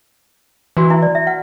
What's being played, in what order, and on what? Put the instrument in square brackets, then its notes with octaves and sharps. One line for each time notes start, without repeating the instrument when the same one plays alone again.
[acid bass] E3 [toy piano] F#4
[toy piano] E4
D5
E5
F#5